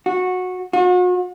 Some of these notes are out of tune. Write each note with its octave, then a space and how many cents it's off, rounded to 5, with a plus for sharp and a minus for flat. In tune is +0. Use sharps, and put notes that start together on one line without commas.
F#4 -15
F#4 -40